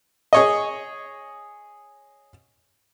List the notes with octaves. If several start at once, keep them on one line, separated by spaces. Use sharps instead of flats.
G#4 C#5 D#5